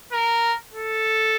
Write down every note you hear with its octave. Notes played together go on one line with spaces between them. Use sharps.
A#4
A4